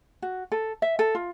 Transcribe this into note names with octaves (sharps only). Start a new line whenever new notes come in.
F#4
A4
E5
A4
F4